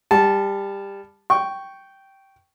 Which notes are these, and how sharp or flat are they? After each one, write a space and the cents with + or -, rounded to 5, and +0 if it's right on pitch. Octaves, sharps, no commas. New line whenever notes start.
G3 +20 A5 -10
G5 -10 C#6 +0